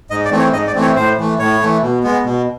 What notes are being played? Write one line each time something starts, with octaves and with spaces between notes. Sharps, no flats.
G#2 D#5
D5
E3 A3 C4
C#5
G#2 D#5
D5
E3 A3 C4
C#5
A2 C5
E3 A3
A2 C#5
E3 A3
B2
G#3 B3
B2